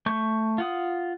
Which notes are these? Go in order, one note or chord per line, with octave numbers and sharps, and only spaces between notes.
A3 C#6 G6
F4 F#5 D#6